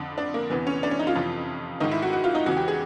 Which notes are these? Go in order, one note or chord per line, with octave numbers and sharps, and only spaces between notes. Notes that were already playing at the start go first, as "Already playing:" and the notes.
Already playing: F2 D3
D4
A#3
E2 C3 E3 B3
C#4
D4
C#4
D#4
F4
F2 C3 E3
G#2 D#3 D#4
E4
F#4
F#4
F4
D#4
E2 C#3 E3 F#4
G4
G#4